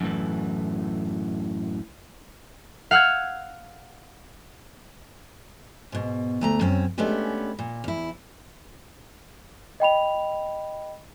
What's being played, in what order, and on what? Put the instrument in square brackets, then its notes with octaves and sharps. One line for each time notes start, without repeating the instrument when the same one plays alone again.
[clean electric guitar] F#2 A2 E3
[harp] F5 F#5 E6 F6 G#6
[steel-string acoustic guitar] G#2 B2
D2 A3 A#5
F#2 C4 C#4
G#3 A3 B3 C#4 D4 G4
A#2
E2 E4
[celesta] D#5 G5 B5 F7